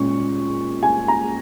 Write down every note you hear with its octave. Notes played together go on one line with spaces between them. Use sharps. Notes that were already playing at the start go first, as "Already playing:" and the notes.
Already playing: A#2 G#3 C#4 C#6
G#5
A#5